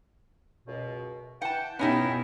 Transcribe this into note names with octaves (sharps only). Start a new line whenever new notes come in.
C#2 F#2 B2
E3 F#5 G5 A5
B2 B3 C#4 D#4 E4 G4